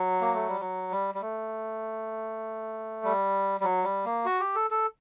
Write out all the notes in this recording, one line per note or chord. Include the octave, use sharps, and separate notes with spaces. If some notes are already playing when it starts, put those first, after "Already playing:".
Already playing: F#3
A#3
A3
G3
F#3
G3
G3
A3
G3
G3
F#3
G3
A#3
F#4
G4
A4
A4